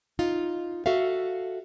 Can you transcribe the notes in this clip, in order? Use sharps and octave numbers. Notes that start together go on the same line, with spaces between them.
D#4 F4
F#4 A4 E5 F5